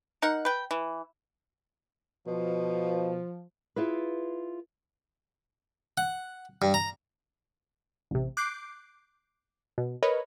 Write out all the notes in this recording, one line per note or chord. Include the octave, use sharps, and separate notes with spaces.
D#4 A#4 F#5
B4 G5
E3
B2 F3
E4 F4 G#4 B4
F#5
G2
A#5
A1 C3
D6 F#6 G6 C7 D7
B2
A#4 B4 C#5 D#5 B5